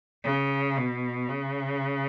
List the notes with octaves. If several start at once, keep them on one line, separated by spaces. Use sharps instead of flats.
C#3
B2
C#3